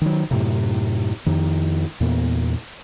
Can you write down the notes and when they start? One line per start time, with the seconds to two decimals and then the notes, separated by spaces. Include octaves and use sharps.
0.02 D#3 F#3
0.31 F#2 A2 C3
1.26 F2 D#3
2.01 E2 A#2 B3